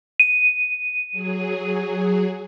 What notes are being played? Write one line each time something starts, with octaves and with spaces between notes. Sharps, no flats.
D#7
F#3 G#4